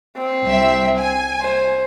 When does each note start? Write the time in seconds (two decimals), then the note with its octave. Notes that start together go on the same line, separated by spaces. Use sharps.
0.18 C4
0.46 C2 E5
1.00 G#5
1.42 C5